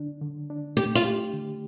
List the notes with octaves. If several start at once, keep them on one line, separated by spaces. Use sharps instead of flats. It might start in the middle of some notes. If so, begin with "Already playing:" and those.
Already playing: D3 D4
D3
D4
A3 G4
F4
G4
D3